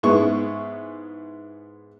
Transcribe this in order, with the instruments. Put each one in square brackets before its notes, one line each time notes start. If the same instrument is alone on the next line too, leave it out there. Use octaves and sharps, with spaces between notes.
[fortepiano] G#2 B3 E4 G#4 C#6